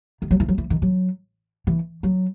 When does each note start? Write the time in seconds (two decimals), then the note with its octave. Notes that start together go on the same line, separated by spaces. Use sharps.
0.22 D#3
0.31 F#3
0.40 E3
0.48 F#3
0.58 E3
0.70 D#3
0.82 F#3
1.67 E3
2.03 F#3